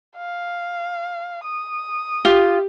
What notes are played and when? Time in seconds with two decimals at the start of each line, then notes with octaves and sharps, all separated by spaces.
0.17 F5
1.44 D#6
2.25 F4 G4